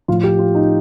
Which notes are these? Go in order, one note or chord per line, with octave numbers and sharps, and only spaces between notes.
A2 F3 F4
G4
F4
D#4